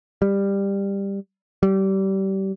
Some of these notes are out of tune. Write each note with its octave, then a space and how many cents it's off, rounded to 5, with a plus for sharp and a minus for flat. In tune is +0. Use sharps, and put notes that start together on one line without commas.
G3 +15
G3 -25